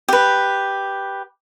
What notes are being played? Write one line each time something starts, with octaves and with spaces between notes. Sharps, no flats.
G4 B4